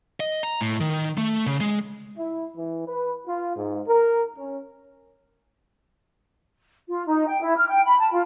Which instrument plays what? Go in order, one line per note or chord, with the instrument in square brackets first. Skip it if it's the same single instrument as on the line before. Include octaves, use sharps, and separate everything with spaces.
[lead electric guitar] D#5
A#5
A2
D#3
A3
C#3
G#3
[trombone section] E4
E3
B4
F4
G#2
A#4
C#4
[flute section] F4
D#4
G5
E4
F6
G5
B5
A5
F4